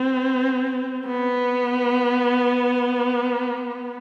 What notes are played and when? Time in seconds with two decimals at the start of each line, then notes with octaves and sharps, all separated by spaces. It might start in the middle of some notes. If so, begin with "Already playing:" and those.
Already playing: C4
1.07 B3